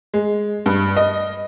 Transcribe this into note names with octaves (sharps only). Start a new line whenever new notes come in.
G#3
G2
D#5